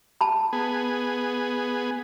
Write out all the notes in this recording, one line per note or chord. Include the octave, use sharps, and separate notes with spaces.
A5 B5
B3 G#4